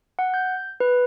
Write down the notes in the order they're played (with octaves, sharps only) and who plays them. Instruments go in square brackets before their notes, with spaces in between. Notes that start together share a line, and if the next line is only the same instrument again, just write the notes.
[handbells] F#5
G6
B4